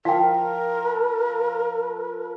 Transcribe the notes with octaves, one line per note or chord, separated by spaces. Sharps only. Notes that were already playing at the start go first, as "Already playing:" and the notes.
F3 A#4 F5 G5